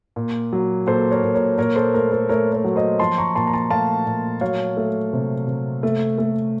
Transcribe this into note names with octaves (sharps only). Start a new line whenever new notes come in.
A#2
F#3
A#2 A4 C5
A#4 C#5
A#2
A#4 C#5
A#2 A#4 C#5
A4 C5
A3 A#4
A4 C5
A3 A#4 C#5
A#4 C#5
F#3
C5 D#5
F3 A5 C6
A#5 C#6
A#2 A5 C6
A#5
A5 C6
A3 F5 A5
A#2
F#3 C#5 F5
A3
C3
C3
A3
A3